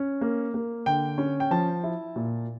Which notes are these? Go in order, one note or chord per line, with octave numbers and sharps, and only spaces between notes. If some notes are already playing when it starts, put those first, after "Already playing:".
Already playing: C#4
A#3
A#3
D3 G5
C#4
G5
F3 A5
E4
A#2